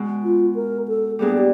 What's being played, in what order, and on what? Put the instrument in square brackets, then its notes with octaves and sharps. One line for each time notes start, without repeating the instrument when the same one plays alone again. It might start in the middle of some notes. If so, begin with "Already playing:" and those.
Already playing: [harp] B2 G#3 B3
[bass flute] F4
A#4
A4
[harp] A#2 G3 B3 D4 [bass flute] G#4
[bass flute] G4